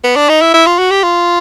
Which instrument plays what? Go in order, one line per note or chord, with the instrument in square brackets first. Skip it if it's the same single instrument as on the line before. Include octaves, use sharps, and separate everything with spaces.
[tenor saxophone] B3
D4
D#4
E4
E4
F4
F#4
G4
F4